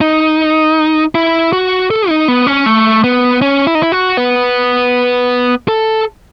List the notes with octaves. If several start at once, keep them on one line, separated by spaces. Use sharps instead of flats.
D#4
E4
F#4
A4
D#4
B3
C#4
A3
B3
C#4
E4
D#4
E4
F#4
B3
A4